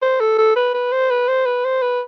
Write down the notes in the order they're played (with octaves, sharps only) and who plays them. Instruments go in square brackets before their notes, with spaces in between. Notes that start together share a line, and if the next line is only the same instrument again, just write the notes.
[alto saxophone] C5
A4
A4
B4
B4
C5
B4
C5
B4
C5
B4